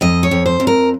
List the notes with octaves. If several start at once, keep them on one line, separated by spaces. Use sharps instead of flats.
F2 D#5
C#5
F2
C5
F2
A#4